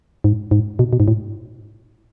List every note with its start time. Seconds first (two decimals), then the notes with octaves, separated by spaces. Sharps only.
0.24 G#2
0.51 G#2
0.79 B2
0.93 B2
1.00 G#2
1.08 A2